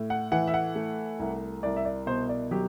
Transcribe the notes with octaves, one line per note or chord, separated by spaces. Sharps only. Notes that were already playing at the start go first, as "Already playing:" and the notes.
Already playing: A2
F#5
E3 F#5
E5
F#5
A3
C2
C2 D5
E5
D5
B2 C5
D5
F#3 G4